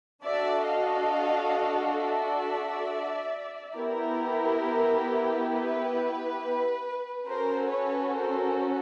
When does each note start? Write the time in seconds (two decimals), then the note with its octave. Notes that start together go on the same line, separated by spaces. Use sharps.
0.24 D4 F#4 A4 D5 E5
0.68 D#5 F5
2.00 D5 E5
3.76 B3 E4 G4 A#4
5.52 B4
7.27 C#4 F#4 A4 A#4 C5
7.71 B4 C#5
8.15 A#4 C5